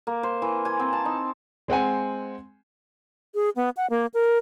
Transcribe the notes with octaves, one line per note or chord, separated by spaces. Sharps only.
A#3
C5
E3
G#5
C4
A5
D#4
G#3 C4 F#5 G#5
G#4
B3
F#5
A#3
A#4